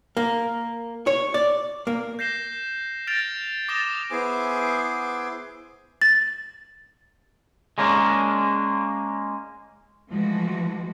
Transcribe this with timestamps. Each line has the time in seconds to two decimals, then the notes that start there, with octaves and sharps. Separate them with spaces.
0.17 A#3
1.07 C#5
1.34 D5
1.87 A#3
2.19 G6 A#6 C7 E7 G7
3.07 F6 G6 A6 A#6 D7 F7
3.69 D6 D#6 A6 A#6 E7 G7
4.10 B3 E4 G#4 C5 G#5 D6
6.02 A6
7.78 G#3 A#3 C#4 D4
10.10 E3 F3 G#3 A3 F#4